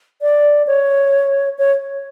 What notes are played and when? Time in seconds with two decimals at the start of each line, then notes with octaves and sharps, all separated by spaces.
0.22 D5
0.67 C#5
1.59 C#5